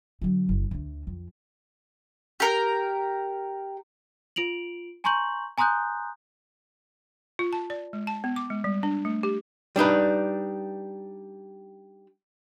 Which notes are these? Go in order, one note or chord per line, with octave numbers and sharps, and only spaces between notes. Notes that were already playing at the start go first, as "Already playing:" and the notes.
D3 F#3
F#1
D2 D3
F2
G4 A#4
F4 D7 F7 F#7
G#5 A#5 C6 C#6 G6 F#7
G#5 A#5 C6 D#6 F#6 G6
F4
A5
D5
G#3
A5
B3
D6
G#3
G3
D4
A3
G4
G3 D4 D#4 B4